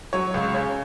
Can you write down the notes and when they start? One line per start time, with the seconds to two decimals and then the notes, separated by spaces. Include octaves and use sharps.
0.13 F#3 C#5
0.34 C#2
0.54 C#3 C#5